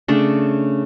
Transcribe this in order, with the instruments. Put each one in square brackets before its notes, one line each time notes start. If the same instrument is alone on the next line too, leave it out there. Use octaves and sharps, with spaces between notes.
[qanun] C#3 A3 D4